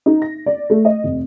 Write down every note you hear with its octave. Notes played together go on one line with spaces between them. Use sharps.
D#4
A#6
D5
A3
D#5
F1